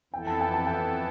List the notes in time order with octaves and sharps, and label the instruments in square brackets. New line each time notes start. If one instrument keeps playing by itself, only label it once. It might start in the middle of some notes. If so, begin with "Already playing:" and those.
[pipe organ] F2 E3 B3 E4 A4 [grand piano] G5
[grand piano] A5
G5
A5
G5